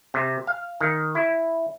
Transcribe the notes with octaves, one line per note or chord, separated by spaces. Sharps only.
C3
F5
D#3
E4